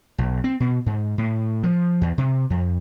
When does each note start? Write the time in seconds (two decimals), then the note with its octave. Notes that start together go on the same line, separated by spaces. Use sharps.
0.18 B1
0.44 C4
0.60 B2
0.86 G#2
1.18 A2
1.63 F3
2.01 E2
2.18 C3
2.50 F2